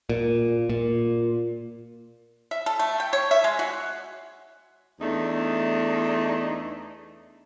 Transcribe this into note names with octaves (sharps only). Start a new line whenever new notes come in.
A#2
A#2
E5
A4
A3
G5
C#5
E5
G#3
F#4
E2 A3 D4 D#4